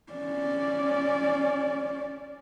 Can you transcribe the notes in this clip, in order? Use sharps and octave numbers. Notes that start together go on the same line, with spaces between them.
C#4 D5